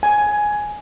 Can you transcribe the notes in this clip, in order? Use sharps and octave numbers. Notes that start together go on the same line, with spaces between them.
G#5